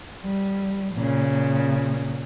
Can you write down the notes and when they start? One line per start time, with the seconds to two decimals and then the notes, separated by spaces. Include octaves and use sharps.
0.23 G3
0.95 A#2 C#3